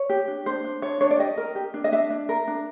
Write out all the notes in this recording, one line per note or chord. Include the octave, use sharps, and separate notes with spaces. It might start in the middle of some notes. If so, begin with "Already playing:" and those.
Already playing: C#5
G4
D4
D4 C5
D4
D4 C#5
D4 C#5
D5
G4 D#5
A#4
G4
D4
D#5
D4 E5
D4
A#4
D4